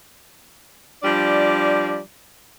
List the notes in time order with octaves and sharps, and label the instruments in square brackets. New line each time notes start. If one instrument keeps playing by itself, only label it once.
[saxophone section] F3 G3 D4 D5